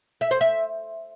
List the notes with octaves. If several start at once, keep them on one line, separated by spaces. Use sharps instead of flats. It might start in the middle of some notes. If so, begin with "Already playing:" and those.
E5
C5
E5